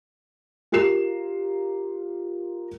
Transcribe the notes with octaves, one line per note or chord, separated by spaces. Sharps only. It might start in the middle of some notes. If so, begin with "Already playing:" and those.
F4 G4 A#4 C7 E7